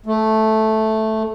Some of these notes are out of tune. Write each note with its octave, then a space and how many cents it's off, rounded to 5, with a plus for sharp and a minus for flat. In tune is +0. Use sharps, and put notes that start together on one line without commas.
A3 -5